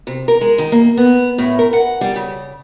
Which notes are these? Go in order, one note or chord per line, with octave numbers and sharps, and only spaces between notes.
C3
A#4
G#3
D#3
A#3
B3
A2
A#4
F#5
G3
C#3